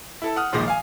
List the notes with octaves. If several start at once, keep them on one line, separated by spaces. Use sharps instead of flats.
E4 A4 A5
F#5 D#6 F6
A#1 A#2 D#3 F3 G#3 C6
F5 G#5